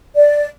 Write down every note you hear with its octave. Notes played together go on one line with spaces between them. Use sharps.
D5